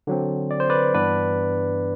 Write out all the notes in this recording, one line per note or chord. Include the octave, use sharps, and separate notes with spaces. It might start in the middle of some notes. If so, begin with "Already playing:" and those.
D3 F#3 C4
D5
C5
B4 D5
G2 E3 B3 D4 B4 D5